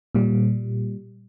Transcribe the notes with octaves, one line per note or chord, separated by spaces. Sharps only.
A#2 G3